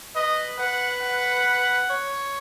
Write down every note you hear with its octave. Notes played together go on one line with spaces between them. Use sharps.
B4 D#5
B4 F#5
F#5
C#5